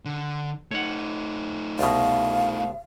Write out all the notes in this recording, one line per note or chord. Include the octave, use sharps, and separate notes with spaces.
D3
A3 D#4 C#5 F#5
C2 B2 F5